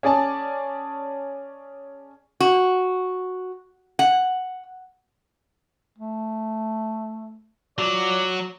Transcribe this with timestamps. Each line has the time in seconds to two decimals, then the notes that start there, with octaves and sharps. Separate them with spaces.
0.03 C#4 G#4 D5 G#5 A5
2.40 F#4
3.99 F#5
5.98 A3
7.79 F#3 F4 D5